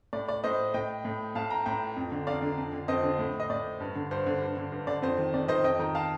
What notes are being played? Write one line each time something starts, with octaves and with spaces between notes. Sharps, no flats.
A2 D5
D5
A2 C5 D#5
A2 D#5 G5
A2
A2 F5 A5
G5 A#5
A2 G5 A#5
F2
D3
F2 D5 F5
D3
F2
D3
F2 C5 D#5
D3
A2
D#5
A2 D5
G2
D3
G2 C5
D3
G2
D3
G2
D3 D5
F2 C5
D#3
F2 D5
D#3 C5 D#5
F2 D#5 G5
D#3 G5 A#5
F5 A5